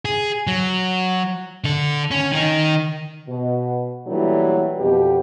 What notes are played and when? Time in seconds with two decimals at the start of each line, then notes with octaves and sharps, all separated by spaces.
0.05 G#4
0.47 F#3
1.64 D3 A4
2.11 C#4
2.32 D#3 D#4
3.28 B2
4.07 A#2 E3 F#3 G3 A3 D4
4.79 F2 B2 G4